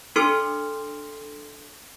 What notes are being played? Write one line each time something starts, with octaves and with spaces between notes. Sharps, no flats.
D4 A4 C6 F6 C#7